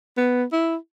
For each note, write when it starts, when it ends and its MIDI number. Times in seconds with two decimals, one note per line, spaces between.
0.17 0.44 59
0.53 0.76 64